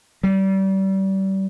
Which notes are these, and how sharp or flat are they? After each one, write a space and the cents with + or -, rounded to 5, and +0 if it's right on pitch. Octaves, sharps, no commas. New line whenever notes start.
G3 -30